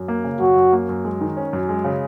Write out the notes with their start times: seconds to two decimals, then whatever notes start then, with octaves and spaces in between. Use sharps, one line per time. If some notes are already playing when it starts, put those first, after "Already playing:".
Already playing: F#2
0.08 A#3
0.24 C#3
0.40 F#2 F#4
0.56 F#2
0.73 A#3
0.89 F#2
1.05 G#3
1.21 D#3
1.37 C#4
1.53 F#2
1.69 G#3
1.84 C#3